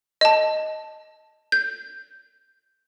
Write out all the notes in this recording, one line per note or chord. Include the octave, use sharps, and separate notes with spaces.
D#5 A5
G6